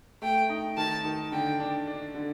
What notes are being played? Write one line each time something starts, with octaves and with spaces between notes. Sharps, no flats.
A3 G5
D#4
D#3 A5
D#3
D3 G5
D4
D4
D3